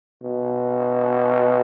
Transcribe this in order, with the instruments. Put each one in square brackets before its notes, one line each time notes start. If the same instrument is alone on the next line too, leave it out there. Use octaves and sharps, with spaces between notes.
[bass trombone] B2